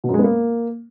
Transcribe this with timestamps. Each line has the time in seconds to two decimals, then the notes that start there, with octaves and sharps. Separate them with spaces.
0.04 B2
0.09 F#2
0.14 G#3
0.19 B3
0.24 A#3